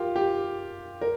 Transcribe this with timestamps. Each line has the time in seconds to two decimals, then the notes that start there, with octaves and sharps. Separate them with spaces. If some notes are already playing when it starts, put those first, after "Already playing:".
Already playing: F4 G4 A#4
0.16 G4
1.01 A#4